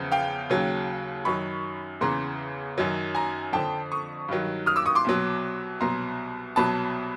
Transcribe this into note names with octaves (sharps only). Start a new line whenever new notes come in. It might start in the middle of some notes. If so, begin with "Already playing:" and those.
Already playing: E2 C#3 F3
F5 G5
D#2 C#3 F#3
F#2 D#3 F#3 B5 C#6
E2 C#3 E3 A#5 C6
F#2 D#3 F#3
G#5 A#5
F2 D3 F3 G5 A5
C#6 D#6
G2 D#3 F#3
D#6 F6
D6 E6
C#6 D#6
C6 D6
C2 B2 F#3
C2 B2 F#3 A#5 C6
C2 B2 F#3 A5 B5